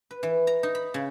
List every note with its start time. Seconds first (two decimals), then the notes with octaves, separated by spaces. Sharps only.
0.11 B4
0.23 E3
0.47 A#5
0.63 D#4
0.75 B5
0.94 C#3